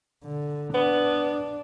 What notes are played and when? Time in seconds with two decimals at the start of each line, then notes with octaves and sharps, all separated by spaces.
0.24 D3
0.74 B3 D4